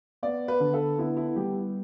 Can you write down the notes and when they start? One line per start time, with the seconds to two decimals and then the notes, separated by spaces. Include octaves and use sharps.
0.23 B3 D5
0.48 B4
0.60 D3
0.74 A4
0.98 B3 E4
1.17 E4
1.36 G3 G4